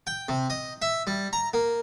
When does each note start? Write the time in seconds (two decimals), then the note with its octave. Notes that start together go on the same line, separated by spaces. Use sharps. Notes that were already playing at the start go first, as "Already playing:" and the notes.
0.07 G5
0.29 C3
0.50 D#5
0.82 E5
1.07 G3
1.33 A#5
1.54 A#3